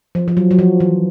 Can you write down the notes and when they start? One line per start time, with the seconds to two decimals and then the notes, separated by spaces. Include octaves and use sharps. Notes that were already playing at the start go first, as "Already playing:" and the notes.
0.15 F3
0.28 F3
0.37 F#3
0.51 F#3
0.59 F3
0.80 E3